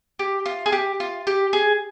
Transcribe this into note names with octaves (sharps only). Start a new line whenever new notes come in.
G4
F4
G#4
G4
F4
G4
G#4